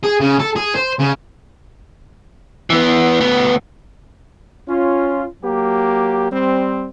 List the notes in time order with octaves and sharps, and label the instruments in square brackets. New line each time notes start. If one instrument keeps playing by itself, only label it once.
[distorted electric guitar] G#4
C#3
A4
G#4
C5
C#3
[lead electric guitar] E3 B3
D2 B3
[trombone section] C#4 F4
F#3 A#3 G4
G3 C4